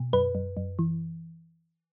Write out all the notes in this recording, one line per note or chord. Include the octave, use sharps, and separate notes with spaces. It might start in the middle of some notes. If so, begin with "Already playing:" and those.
Already playing: B2
F#2 B4
F#2
F#2
E3